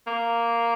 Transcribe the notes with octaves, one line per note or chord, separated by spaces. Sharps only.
A#3